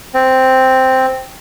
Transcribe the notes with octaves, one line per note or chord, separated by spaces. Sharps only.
C4